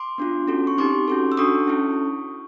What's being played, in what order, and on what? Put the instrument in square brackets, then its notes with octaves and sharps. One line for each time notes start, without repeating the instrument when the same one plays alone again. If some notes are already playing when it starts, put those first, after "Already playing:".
Already playing: [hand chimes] C6 D6
B3 D4 F4
C#4 F#4 A4
C#6
C4 D#4 G4 C6 D6
C#4 F#4 A4
E6
D4 F#4 A4 C#6 D#6
C#4 E4 A4